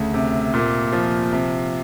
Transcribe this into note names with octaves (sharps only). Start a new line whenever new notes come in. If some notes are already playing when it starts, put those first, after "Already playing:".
Already playing: D2 C#3
C3
A#2
F3
C3